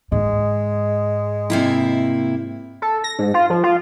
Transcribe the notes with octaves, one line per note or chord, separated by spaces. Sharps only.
G#2 G#3
C3 A#3 E4
A4
A#6
G#2
F4
F3
F4